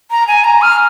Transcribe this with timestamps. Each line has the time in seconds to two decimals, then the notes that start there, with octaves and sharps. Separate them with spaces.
0.11 A#5
0.28 G#5
0.44 A#5
0.62 F6